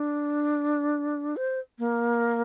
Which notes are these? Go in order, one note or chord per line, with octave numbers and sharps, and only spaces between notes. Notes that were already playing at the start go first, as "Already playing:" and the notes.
Already playing: D4
C5
A#3